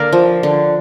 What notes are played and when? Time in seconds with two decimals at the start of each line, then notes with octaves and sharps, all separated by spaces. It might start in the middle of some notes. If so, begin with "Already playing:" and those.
Already playing: D3 A#3 A#4 D5 F5
0.13 F3
0.43 D3